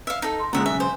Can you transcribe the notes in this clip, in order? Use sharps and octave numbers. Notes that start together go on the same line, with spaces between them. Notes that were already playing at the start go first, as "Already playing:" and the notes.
E5 F5 F6
D#4 A4
C6
A#2 C#3 G#3 E5 F#5 A#5
B1 C#3 E5 G#5
C5 G#5